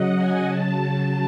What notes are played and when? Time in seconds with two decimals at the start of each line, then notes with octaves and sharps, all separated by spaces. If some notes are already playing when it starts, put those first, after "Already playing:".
Already playing: C#3 F#3 D#5 F#5
0.16 G#5
0.45 C#3 F#3 A5